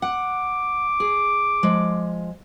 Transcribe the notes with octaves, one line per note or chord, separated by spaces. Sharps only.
F#5 D6
G#4
F3 G#3